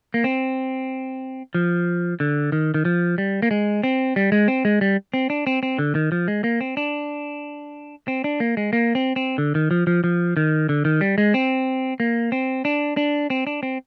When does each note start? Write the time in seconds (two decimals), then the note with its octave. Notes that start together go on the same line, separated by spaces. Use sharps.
0.14 A#3
0.24 C4
1.55 F3
2.20 D3
2.52 D#3
2.74 D#3
2.85 F3
3.18 G3
3.42 A#3
3.51 G#3
3.83 C4
4.16 G3
4.32 G#3
4.48 C4
4.65 G#3
4.81 G3
5.14 C4
5.30 D4
5.47 C4
5.63 C4
5.79 D3
5.95 D#3
6.12 F3
6.28 G#3
6.44 A#3
6.61 C4
6.77 D4
8.08 C4
8.24 D4
8.40 A#3
8.57 G#3
8.73 A#3
8.95 C4
9.16 C4
9.38 D3
9.55 D#3
9.71 F3
9.87 F3
10.04 F3
10.37 D#3
10.69 D3
10.85 D#3
11.01 G3
11.18 G#3
11.34 C4
12.00 A#3
12.32 C4
12.65 D4
12.97 D4
13.30 C4
13.47 D4
13.63 C4